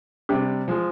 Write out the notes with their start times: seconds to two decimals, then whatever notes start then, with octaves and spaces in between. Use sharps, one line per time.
0.29 C3 G3 D4 G4
0.68 F3 G#3